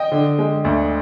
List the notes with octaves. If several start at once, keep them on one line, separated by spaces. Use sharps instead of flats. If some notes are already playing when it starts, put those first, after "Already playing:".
Already playing: D#5 G5
D3
G#3
D2